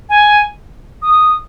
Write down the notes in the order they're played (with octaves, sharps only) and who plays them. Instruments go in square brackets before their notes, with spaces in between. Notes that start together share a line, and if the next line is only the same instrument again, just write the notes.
[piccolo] G#5
D#6